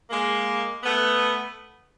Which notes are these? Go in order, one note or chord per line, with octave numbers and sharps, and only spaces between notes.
G#3 A#3
A3 B3